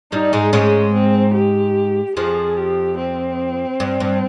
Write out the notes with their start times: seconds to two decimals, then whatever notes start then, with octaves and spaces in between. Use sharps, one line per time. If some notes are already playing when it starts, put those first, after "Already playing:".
0.12 G2 G3 D#4
0.33 G#2 G#3
0.53 G#2 G#3 C#4
0.94 C4
1.35 G4
2.17 F2 F3 G#4
2.57 G4
2.99 C4
3.80 G2
4.00 G2